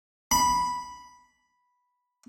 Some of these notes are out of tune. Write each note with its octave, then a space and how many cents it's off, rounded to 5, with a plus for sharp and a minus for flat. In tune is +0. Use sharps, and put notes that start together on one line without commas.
B5 -5